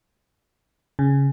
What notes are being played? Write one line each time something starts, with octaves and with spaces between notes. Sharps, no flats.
C#3